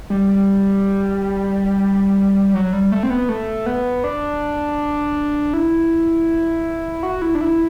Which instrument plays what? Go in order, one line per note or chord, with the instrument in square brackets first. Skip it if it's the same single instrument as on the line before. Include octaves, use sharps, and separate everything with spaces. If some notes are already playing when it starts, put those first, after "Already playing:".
[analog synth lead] G3
G3
F#3
G3
A3
C4
B3
A3
B3
D4
E4
F#4
E4
D4
E4